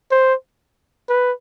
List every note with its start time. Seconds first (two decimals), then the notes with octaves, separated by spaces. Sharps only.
0.11 C5
1.09 B4